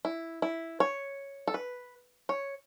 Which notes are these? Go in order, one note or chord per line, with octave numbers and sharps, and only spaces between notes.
E4
E4
C#5
A4
B4
C#5